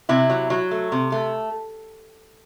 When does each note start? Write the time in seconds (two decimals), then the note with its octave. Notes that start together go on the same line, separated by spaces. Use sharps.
0.09 C3 E4
0.30 F#3
0.50 F#3
0.71 A3
0.92 C3
1.12 A3